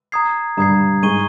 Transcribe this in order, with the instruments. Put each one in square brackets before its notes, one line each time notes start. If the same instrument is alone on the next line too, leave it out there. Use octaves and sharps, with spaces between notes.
[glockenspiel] A#5 D#6 G#6 C7
[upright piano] G2 G3 [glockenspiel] A#5 D#6 G#6 C7
[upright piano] G#2 G#3 [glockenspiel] C#6 G#6 D#7 G7